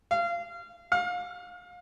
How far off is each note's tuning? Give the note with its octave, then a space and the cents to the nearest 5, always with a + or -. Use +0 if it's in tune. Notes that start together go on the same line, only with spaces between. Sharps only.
F5 -25
F5 +30